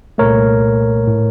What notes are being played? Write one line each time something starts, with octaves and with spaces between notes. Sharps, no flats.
C2 A#2 A3 A#4 C#5
A2 A3